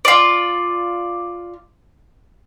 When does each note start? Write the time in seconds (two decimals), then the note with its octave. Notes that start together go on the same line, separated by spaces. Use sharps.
0.05 F4 D5